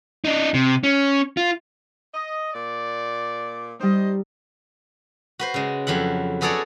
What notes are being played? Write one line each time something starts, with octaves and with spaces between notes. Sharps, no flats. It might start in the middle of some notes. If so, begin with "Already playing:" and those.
D4 D#4
C3
C#4
F4
D#5
A#2 D5
G3 D#4 C5 D#5
F#4 B4 C5
C#3 G#3
F2 F#3 E4 F#5
B3 F#4 G#4 A4 C#5 D5